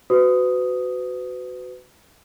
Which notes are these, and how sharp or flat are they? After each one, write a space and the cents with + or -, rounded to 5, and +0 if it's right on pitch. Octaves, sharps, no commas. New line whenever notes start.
F#4 +0 B4 +30 D#6 +0